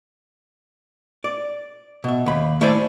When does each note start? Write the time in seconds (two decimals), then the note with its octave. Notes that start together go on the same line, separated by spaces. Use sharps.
1.24 D5
2.04 B2 E5
2.26 D#2 B5
2.61 A3 E4 C5 D5 G#5 A5